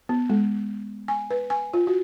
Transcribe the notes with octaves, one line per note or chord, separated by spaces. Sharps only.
B3
G#3
G#5
B4
G#5
F4
F#4